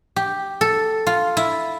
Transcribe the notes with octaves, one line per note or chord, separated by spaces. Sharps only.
G4
A4
F4
E4